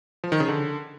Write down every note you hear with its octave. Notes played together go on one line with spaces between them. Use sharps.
F3
D#3
C#3
D3